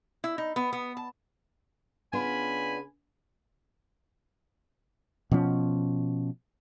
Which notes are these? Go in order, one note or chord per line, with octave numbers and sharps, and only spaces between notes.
E4
D#4
B3
B3
A5
C#3 B3 D4 F4 G#5 B5
B2 F3 C#4